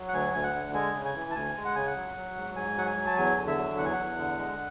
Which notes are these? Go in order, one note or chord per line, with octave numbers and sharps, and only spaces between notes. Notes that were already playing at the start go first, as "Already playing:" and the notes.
Already playing: F#3
F#5
D2 G#5
D2 G#5
F#5
D3
G#3 G#5
C#3
G#5
E3
A5
D2 G#5
G#3
F#5
C#3 G#5
F#5
F#3
F#3
G#2
G#2 G#5
F#3 F#5
G#5
F#3
A5
E2 G#5
D3
E5
F#3
E2 F#5
G#5
F#5
E2
D3
G#3